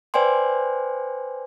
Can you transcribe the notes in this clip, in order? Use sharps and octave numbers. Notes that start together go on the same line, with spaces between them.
B4 C5 D5 G5 G#5 C6